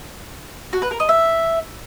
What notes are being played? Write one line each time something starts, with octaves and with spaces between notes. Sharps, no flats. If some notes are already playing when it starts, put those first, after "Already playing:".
F#4
B4
A#4
D#5
E5